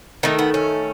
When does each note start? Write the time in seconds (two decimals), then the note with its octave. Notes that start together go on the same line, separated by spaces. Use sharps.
0.23 D#3 A3 D#4
0.39 B3
0.54 C#4